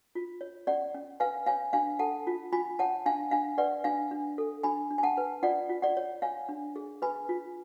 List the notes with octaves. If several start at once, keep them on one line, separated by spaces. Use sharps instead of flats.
F4
C#5
C#4 D5 F#5
C#4
B4 F5 G#5
C#5 F5 G#5
D4 F5 G#5
A4 F#5 A5
F4
F4 G#5 B5
C#5 F#5 A5
D4 F5 G#5
D4 F5 G#5
B4 D5 F#5
D4 F5 G#5
D4
A4
D4 G#5 B5
D4
G#5
F#5 A5
B4
F4 D5 F#5
F4
D5 F#5
C#5
C#5 F5 G#5
D4
G#4
B4 G#5 B5
F4